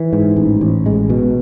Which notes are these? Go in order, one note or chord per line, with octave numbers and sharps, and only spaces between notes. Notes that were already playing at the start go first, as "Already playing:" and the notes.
Already playing: E3
G#2
A1
A1
G#3
B2